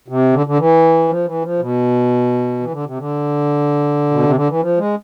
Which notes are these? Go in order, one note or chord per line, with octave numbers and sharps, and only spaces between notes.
C3
D3
D3
E3
F3
E3
F3
B2
E3
D3
C3
D3
B2
C3
D3
E3
F3
G#3